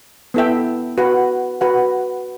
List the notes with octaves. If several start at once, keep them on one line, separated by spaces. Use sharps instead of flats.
B3 E4 A4 E5 G5
F#4 B4 F#5
F#4 B4 F#5